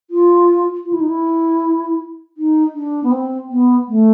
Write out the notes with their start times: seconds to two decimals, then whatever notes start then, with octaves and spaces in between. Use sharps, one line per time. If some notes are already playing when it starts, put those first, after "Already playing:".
0.10 F4
0.85 F4
0.93 E4
1.00 D#4
1.09 E4
2.37 D#4
2.74 D4
3.04 B3
3.11 C4
3.49 B3
3.88 A3